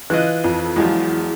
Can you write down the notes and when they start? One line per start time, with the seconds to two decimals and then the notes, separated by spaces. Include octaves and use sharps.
0.10 E3 F4 D#5 F#6
0.44 F2
0.76 E2 F3 F#3 G#3